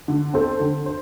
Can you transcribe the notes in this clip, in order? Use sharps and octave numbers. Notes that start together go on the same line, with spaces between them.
D3
C4 A4 C5
D3
C5